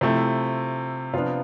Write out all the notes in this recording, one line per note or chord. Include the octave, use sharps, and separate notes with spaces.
C3 F3 A3 E4
C3 F3 B3 D4 F4 F5